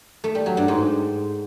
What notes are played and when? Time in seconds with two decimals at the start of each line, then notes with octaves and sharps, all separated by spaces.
0.24 A3
0.35 G3
0.46 F#3
0.57 G2
0.68 G#2